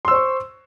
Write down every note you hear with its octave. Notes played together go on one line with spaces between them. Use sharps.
C5 C6 C#6 E6